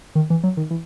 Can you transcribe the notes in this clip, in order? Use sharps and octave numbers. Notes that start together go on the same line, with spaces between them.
D#3
E3
F#3
D#3
E3